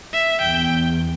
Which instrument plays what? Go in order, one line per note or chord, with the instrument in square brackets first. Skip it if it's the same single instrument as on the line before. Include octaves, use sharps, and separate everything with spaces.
[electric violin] E5
[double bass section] E2 [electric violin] G5